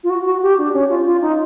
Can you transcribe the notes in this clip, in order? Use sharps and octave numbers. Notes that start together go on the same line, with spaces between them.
F4
F#4
F#4
G4
D4
C#4
F4
F4
D#4